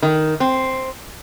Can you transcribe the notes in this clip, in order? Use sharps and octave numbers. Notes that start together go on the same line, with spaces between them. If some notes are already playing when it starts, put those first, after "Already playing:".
D#3
C4